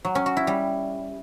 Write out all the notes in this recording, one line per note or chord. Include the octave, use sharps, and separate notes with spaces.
F#3
C#4
F#4
E4
G3